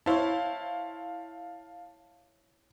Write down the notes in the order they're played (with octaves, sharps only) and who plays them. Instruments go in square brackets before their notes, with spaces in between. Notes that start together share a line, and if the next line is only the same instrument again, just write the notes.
[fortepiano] E4 C5 C#5 [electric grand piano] F5 A5